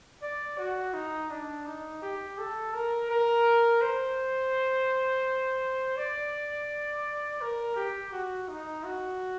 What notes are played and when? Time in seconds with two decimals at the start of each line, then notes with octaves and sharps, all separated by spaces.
0.22 D5
0.59 F#4
0.94 D#4
1.30 D4
1.66 D#4
2.02 G4
2.38 A4
2.74 A#4
3.10 A#4
3.82 C5
5.97 D5
7.41 A#4
7.76 G4
8.13 F#4
8.48 D#4
8.85 F#4